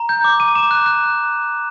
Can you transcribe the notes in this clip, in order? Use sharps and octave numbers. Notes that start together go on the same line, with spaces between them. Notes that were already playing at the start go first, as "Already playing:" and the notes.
Already playing: A#5
G6
D6
D6 D#7
D6 E7
F#6
F#6